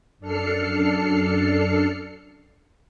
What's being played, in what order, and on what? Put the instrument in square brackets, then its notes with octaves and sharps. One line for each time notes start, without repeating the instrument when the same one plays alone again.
[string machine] F#2 D4 A4 F6 C7 C#7